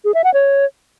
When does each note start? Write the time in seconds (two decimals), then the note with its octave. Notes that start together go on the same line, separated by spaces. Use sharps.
0.05 G#4
0.14 E5
0.24 F#5
0.34 C#5